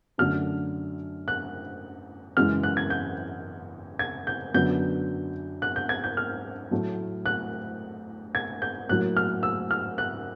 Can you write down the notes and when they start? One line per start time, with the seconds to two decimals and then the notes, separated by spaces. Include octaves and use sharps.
0.18 F#2 D3 F#3 A3 F6
1.28 F#6
2.37 F#2 C#3 E3 G#3 F6
2.63 F#6
2.77 G#6
2.90 G6
3.99 G#6
4.27 G6
4.54 F#2 D3 F#3 B3 G6
5.62 F#6
5.76 G6
5.89 G#6
6.04 G6
6.17 F6
6.71 A2 F#3 A3
7.26 F#6
8.35 G#6
8.62 G6
8.89 A2 F#3 A#3 F#6
9.17 F6
9.43 E6
9.71 F6
9.98 F#6